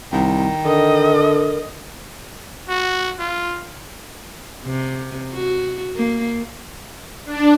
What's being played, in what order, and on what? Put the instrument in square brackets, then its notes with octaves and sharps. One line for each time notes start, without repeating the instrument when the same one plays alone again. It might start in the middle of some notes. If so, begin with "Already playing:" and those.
[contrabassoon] C2 [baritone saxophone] D#3
[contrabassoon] D3 [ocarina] A#4 [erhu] D#5
[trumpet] F#4
F4
[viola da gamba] C3
F#4
A#3
[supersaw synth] D4